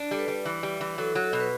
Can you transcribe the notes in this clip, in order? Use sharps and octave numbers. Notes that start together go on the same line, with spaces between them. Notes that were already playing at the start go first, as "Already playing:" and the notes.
Already playing: D4
G3 A4
B4
G3
E3
G3
E3
F#3 A4
F#3
A4
B2
B4